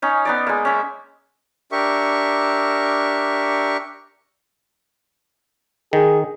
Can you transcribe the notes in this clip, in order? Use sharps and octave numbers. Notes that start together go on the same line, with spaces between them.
C#4 D#4
B3 D#4 D5
G#3 A#3
C#4 E5
D4 G4 A#4 E5 C#6
D#3 G#4